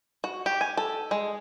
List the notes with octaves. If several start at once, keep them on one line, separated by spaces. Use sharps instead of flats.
F#4
G4
G#5
A4
G#3